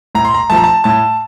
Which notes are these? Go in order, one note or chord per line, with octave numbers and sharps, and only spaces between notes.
A2 A#5
C6
A#5
F3 A3 A5
A#5
A5
A2 A5